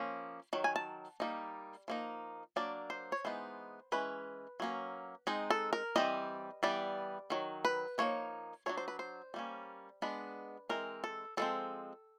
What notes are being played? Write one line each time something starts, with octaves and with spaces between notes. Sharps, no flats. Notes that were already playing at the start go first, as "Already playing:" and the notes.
Already playing: F3 A#3 C#4
D#3 F#3
G#5
A5
G3 A#3 D#4
F3 A#3 D#4
F#3 A#3 D4 D5
C5
C#5
E3 G#3 B3 D#4 C5
E3 G#3 C#4 B4
F#3 A#3 C#4
G#3 C4 D#4
A4
A#4
E3 G3 C4 D#5
E3 G3 B3 D5
D#3 F#3
B4
F3 A#3 D#4 C#5
F#3 A#3 D4 C#5
C5
B4
C5
G3 A#3 C#4
G#3 B3 D4 B4
E3 G#3 C4 A#4
A4
F3 G#3 C4 A4